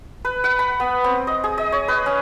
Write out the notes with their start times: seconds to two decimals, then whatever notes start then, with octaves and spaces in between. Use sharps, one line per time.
0.25 B4
0.44 F#5
0.59 B5
0.80 B3
1.04 C4
1.27 D#5
1.44 G#4
1.58 D#5
1.72 C#5
1.88 B4
2.06 C#4